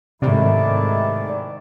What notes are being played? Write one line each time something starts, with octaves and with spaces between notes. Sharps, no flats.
G#2 C3 D#3 A3 E4 D5